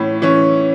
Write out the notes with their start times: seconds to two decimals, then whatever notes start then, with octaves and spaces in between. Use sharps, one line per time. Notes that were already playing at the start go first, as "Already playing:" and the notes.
Already playing: A2 E3 C#4 B5
0.22 E3 C#4